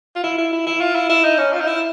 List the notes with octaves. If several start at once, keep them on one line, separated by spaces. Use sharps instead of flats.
F4
E4
E4
E4
E4
F4
E4
E4
D#4
C#4
F4
D#4
E4